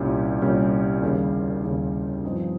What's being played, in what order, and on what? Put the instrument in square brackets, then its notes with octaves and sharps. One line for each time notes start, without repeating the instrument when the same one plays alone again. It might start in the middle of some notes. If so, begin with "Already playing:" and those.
Already playing: [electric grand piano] C2 A#2 G3 C#4 G4
C2 A#2 G3 C#4 G4
D#2 C#3 G3
D#2 C#3 G3
G2 F3 C4 D#4